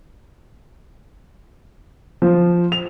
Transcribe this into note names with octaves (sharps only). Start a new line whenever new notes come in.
F3
F7